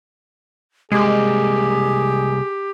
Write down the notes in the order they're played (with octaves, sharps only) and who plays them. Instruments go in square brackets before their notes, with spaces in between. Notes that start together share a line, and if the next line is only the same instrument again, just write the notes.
[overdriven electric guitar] C2 A#3 [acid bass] G#3 [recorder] G4 [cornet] G#4